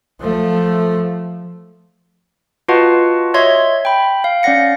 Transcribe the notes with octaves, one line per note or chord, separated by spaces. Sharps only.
F3 A3
F4 F#4 B4 D#5 F#5 A5
C#5 D#5 E5 C6 G#6
G5 B5
F5
C#4 D5 F5 F#5 A#6 C#7